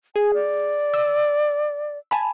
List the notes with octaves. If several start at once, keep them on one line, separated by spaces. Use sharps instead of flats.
G#4 G#5
D5
E6
G#5 A5 B5